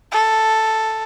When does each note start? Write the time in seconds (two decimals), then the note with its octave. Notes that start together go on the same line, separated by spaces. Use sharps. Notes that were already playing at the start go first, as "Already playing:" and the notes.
0.12 A4